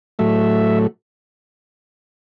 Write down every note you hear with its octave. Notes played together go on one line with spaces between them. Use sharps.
A2 F#3 A3 E5